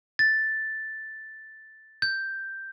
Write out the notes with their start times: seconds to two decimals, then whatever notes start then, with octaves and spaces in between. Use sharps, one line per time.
0.19 A6
2.02 G6